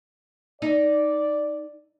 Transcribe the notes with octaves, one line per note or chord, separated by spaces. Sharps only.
D#4 D5